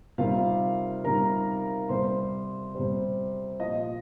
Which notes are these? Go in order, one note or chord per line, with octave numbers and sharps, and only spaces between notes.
C3 D#3 G3 F4 F5
C3 D#3 G3 A#4 A#5
C3 G3 C5 C6
C3 G3 C5
A#2 F3 D#5